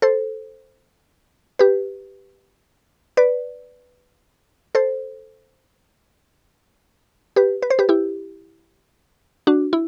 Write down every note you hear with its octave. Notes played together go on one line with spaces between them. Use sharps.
A4 C5
G4 B4
B4 D5
A4 C5
G4 B4
B4
C5
G4 B4
E4 G4
D4 F#4
E4